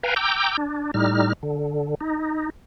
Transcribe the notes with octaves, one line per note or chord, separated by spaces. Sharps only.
B4 F5 G5 G#5 A#5
G5 A#5 D6 E6 G6
D4
A2 G3 D#4 F6
D3
D#4